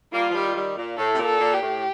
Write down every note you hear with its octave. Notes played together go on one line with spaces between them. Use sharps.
G3 A#3 F4
F3
D#3 G3
D#3 G3
A#2
A2 A4
C3
A#2
A4
A#2
G4
A2